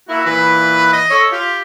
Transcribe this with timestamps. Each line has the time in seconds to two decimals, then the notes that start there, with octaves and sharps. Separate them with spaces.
0.09 A#3 E4 F#4
0.26 A#2 E3 B4
0.93 D#5
1.10 A4 C#5
1.33 F4 G4